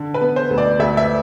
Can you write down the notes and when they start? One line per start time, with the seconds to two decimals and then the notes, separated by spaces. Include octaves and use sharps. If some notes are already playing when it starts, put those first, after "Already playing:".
Already playing: D3
0.14 B4
0.21 B3
0.36 C5
0.50 D2
0.58 D5
0.79 D2 E5
0.97 E5